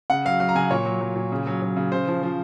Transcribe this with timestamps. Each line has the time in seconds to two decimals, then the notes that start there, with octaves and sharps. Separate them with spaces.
0.10 C#3 F#5
0.25 F#3 F5
0.40 F#3 F5
0.49 A#5
0.55 C#3 G#5
0.71 A#2 C#5
0.86 F#3
1.01 F#3
1.16 A#2
1.32 C#3
1.47 F#3
1.62 F#3
1.77 C#3
1.92 C#3 C5
2.08 F3
2.23 F3